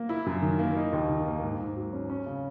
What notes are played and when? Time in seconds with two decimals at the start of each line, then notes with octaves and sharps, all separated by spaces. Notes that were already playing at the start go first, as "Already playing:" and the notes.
Already playing: A#3
0.09 E4
0.26 F#2
0.42 D#3
0.59 A#3
0.76 D#4
0.93 D#2
1.09 D#3
1.26 A#3
1.43 G#2
1.59 G#2
1.76 F#3
1.93 C#4
2.10 C#4
2.26 C#3